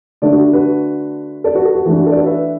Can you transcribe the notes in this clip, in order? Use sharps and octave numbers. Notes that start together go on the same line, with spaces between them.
D3 A3 D4 A4 D5
F#4
F#4 B4
A4 D5
F#4 B4
A4
F#4
E3 A3 D4 A4
F#4
A4
D5
F#4 B4
B4 E5